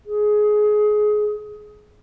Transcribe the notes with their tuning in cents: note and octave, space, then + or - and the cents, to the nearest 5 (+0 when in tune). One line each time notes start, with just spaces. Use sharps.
G#4 +20